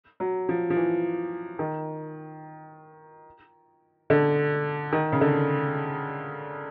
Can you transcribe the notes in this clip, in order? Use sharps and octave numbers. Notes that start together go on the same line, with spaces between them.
F#3
F3
F3
E3
D#3
D3
D#3
C#3
D3